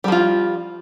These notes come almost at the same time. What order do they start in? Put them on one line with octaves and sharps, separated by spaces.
G3 F3 F4